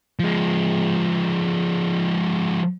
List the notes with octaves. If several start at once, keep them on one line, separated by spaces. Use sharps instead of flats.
F3 G#3